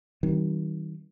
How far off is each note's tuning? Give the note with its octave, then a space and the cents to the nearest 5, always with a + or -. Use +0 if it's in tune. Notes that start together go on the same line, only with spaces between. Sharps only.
D#3 +25 G3 -40 C4 +45